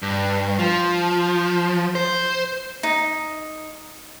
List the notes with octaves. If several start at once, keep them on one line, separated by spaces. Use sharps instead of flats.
G2
F3
C5
D#4